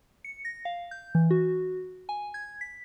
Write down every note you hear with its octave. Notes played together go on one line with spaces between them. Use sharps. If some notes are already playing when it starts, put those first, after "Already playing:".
C#7
A#6
F5
G6
E3
F#4
G#5
G#6
B6